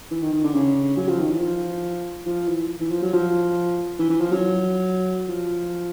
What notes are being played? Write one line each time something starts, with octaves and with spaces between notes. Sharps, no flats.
E3
D#3
D#3
D3
C#3
F#3
F3
D#3
E3
F3
F3
E3
E3
F3
F#3
F3
E3
E3
F3
F#3
F3